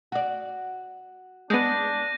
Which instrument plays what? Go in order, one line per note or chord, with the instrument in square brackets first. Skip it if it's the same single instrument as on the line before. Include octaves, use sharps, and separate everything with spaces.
[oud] F#4 D5
[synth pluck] G#3 B3 [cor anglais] D4 [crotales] G6 A#6 D#7